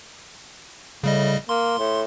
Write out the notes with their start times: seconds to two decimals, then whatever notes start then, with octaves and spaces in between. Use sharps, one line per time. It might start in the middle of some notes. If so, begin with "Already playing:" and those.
1.04 A2 C#3 G3 D#5
1.49 A#3 C6
1.79 A2